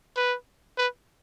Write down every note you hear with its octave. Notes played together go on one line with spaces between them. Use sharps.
B4
B4